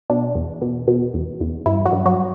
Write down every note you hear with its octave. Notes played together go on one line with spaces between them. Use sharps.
B2 D4
E2
B2
B2
E2
E2
G2 E4
F#3 F#4
G2
F#3 F#4